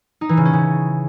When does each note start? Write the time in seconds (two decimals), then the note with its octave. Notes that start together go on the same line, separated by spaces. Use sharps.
0.21 D#4
0.29 E3
0.37 C#3
0.45 C#4
0.53 C#3